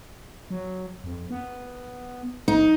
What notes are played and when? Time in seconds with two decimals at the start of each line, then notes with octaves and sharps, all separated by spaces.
0.50 F#3
1.04 F2
1.30 B3
2.48 A#1 D#4